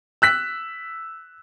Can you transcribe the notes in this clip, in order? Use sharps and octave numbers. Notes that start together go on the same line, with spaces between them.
E6 F#6 B6